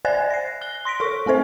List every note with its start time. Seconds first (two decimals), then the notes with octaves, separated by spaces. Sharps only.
0.05 C5 D5 E5 G#5 F#6 A6
0.31 A#6 C7
0.61 F#6 G7
0.85 C6 A#6 B6 D7
1.00 A4 A#4 C#6
1.26 A3 C4 A4 C5 E5